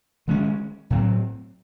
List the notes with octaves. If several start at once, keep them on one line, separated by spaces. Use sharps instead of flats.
D#3 G#3 C#4
A2 F#3 C4